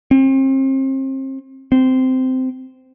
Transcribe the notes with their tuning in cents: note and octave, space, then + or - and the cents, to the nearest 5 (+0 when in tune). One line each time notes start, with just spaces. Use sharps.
C4 +35
C4 -15